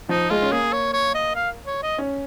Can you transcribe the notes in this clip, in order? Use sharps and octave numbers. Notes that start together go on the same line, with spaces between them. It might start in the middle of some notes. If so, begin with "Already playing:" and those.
F3 D#4
G#3 F4
C#4
A#3 G#4
C#5
C#5
D#5
F5
C#5
D#5
C#4